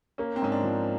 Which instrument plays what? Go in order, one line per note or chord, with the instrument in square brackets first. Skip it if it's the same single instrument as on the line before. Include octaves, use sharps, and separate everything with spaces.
[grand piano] A#3 [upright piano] C#4
[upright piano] C4
[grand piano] G#2 [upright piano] C#4
[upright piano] D4
[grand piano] F3